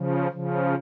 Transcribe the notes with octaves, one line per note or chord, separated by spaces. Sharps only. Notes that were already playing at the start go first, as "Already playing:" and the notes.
Already playing: C#3 F3
C#3 F3